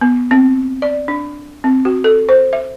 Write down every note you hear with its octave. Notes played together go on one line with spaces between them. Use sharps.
B3
C4
D5
D4
C4
F#4
A4
C5
E5